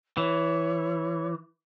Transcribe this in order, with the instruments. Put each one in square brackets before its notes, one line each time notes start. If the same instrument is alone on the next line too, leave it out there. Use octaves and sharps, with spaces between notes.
[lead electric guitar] E3 [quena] C#5